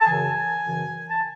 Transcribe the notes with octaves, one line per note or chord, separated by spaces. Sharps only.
A5
F#2 C#3 E3 G#5
F#2 C#3 E3
A5